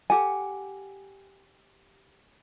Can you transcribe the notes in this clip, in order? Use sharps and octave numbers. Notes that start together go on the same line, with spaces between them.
G4 A4 F#5 G#5